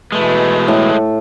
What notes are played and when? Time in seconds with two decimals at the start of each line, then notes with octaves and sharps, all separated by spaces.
0.12 B2 E3 G#3 A3 B4
0.68 A2